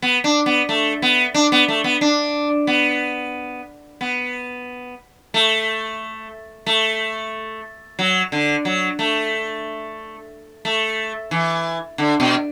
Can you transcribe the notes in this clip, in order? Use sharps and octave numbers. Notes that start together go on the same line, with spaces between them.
B3
D4
B3
A3
B3
D4
B3
A3
B3
D4
B3
B3
A3
A3
F#3
D3
F#3
A3
A3
E3
D3
B2